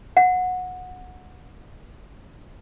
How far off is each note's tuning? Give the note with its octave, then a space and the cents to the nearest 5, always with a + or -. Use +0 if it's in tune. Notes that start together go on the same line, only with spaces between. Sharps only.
F#5 -20